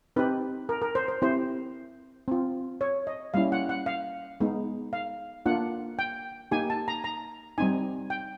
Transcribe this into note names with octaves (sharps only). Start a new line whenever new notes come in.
C4 D#4 G4 B4
A#4
A#4
C5
C5
C4 E4 G4 C5
C4 F4
C#5
D#5
G3 A#3 C#4 E4 F5
F#5
F#5
F5
G#3 B3 D#4
F5
A#3 D4 F4 F#5
G5
A#3 D#4 G4 G#5
A5
A#5
A#5
G3 C4 D#4 G#5
G5